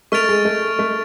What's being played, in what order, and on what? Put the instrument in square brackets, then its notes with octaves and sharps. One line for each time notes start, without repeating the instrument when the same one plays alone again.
[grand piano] A3 [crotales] C#6 F6 A6 D7 F7
[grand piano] G#3
A3
A3